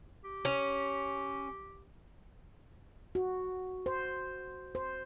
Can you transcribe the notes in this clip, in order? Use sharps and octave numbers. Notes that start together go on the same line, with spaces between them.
G4
C#4
F#4
C5
C5